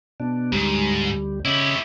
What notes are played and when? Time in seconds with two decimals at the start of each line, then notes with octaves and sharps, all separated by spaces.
0.20 B2 D4
0.52 D2 G#2 G3
1.45 C#3 E4 G4 C#5 D#5